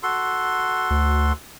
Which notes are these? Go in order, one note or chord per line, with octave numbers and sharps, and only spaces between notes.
F#4 A4 C6
D2